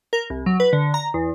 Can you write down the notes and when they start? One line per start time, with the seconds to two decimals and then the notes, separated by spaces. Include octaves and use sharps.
0.13 A#4
0.30 C2
0.46 F#3
0.60 B4
0.73 D3
0.94 A#5
1.14 E2